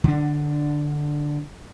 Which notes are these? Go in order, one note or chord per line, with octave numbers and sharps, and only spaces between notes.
D3 D4